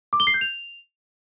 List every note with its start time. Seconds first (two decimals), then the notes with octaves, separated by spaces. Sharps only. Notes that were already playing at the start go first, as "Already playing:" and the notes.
0.13 D6
0.20 G7
0.27 C7
0.34 G6
0.41 F7